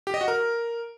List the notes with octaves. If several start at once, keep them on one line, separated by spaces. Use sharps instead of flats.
G4
D#5
F#4
A#4